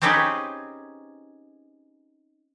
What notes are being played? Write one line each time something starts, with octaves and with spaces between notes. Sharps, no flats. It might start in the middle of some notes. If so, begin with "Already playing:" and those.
C4 C#4 D#4 G4 G#4 B4